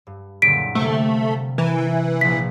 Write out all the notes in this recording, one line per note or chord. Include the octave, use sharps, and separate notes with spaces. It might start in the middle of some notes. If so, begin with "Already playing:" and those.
G2
F#1 A#2 D3 B6 D7
C3 G3 A3 A#3
E3 A#4
A#1 F3 B6